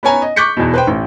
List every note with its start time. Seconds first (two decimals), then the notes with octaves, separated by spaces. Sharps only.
0.03 B3 C#4 C#5 G#5 A#5
0.22 D#5
0.36 C#6 D6 F#6 G6 B6 C#7
0.57 E2 B2
0.74 B4 C5 G5
0.87 A1